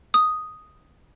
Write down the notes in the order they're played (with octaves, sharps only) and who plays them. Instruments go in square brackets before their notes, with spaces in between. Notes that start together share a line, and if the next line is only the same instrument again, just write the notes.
[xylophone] D#6